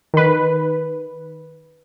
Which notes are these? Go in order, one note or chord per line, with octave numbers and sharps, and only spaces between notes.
D#3 B4